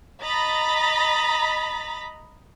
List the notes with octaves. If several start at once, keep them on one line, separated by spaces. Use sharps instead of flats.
D#5 A#5 B5 A6 B6